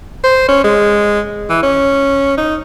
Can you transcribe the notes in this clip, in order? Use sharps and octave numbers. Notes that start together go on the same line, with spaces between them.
C5
C#4
G#3
E3
C#4
D#4